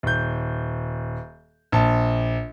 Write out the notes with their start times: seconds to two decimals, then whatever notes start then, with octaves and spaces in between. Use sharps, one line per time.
0.03 D#1 G6
1.72 A#1 A5